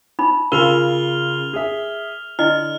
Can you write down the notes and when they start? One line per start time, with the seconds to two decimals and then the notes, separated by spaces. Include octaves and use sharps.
0.19 D#4 B5
0.52 C#3 F4 A#4 F6 F7 G7
1.53 G#4 E5
2.39 D3 E4 D#5 F6